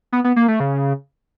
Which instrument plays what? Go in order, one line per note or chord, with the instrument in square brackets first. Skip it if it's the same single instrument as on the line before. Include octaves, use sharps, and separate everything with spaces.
[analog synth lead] B3
B3
A#3
A3
C#3